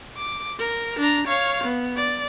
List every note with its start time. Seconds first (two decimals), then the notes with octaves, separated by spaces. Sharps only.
0.17 D6
0.59 A#4
0.99 D4 A#5
1.27 C#5 F5
1.64 B3
1.96 D5